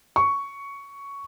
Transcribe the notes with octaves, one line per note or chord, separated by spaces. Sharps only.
C#6